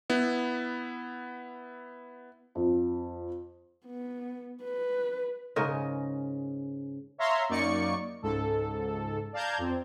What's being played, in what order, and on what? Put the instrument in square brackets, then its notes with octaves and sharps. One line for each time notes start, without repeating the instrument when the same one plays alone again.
[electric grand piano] B3 E4
[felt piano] F2
[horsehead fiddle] B3
B4
[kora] G#2 C#3 A#4 D#5
[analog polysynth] C#5 E5 F5 A#5 C6
F#2 A#3 D#4 D5 C#6 C#7
C#2 G#2 A4
D5 F5 A5 A#5 G6 G#6
F2 C4